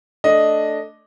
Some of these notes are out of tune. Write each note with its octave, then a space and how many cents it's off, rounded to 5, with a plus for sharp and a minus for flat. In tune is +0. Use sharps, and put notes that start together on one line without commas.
A3 +0 D4 +0 D#5 +0